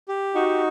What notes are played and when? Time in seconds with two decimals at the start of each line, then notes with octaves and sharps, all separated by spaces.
0.08 G4
0.34 D#4 F#4